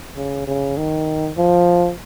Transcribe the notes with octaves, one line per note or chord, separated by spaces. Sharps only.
C#3
C#3
D#3
F3